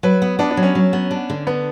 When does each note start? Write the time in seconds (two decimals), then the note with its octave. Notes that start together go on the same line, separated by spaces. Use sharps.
0.03 F#3 B4
0.22 B3
0.39 B3 D4
0.51 D4
0.57 F#3
0.63 C#4
0.75 F#3
0.93 B3
1.11 D4
1.30 D3
1.47 B3 D4